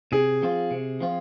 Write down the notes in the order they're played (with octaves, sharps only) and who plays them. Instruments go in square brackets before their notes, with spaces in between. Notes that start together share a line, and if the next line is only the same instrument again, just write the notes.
[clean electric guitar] C3 [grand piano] G#4
[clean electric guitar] F3 C4 F4
C3
F3 C4 F4